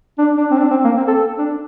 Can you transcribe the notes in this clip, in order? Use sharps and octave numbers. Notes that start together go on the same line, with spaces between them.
D4
D4
C4
D4
C4
A#3
C4
A4
D4